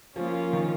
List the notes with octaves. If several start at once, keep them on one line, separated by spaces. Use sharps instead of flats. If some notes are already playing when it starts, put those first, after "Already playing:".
F3 A#3 C#4 F4 A#4
D#3